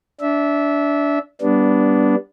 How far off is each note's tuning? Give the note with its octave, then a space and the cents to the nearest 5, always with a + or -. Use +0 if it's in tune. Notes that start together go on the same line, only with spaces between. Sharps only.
D4 -25 E5 -15
G3 +0 B3 -10 D4 -15